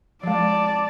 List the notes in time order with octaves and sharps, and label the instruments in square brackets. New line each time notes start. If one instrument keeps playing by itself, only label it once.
[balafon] F3 G#3 [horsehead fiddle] D5 A5